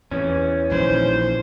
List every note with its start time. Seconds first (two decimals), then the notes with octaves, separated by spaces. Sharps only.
0.11 E2 E3 C#4
0.71 A#1 D#3 C5